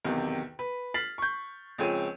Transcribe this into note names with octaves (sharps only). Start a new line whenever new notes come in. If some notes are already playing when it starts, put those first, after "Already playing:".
B1 E2 C3 D#3
B4
F6 A6 B6 C7 F#7
C#6 G6
C#2 F3 C4 G#4 C#5 D#7